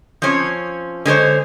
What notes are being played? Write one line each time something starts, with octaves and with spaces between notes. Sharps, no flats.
F3 C4 C#4 C#5
D3 G#3 C5 C#5